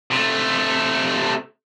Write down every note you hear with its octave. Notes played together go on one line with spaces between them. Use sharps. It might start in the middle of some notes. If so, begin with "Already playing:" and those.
C3 A3